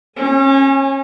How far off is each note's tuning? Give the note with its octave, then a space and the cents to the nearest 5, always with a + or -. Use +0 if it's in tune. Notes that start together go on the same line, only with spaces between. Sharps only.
C#4 -30 G#5 +0